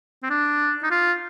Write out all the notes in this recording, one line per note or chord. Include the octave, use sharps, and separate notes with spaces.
C4
D4
D#4
F4